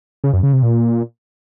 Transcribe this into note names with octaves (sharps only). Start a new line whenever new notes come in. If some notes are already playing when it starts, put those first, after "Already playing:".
C#3
F#2
C#3
C3
A#2